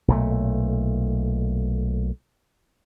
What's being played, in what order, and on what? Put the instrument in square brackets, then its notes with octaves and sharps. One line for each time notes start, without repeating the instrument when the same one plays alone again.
[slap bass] B1 A#2 A3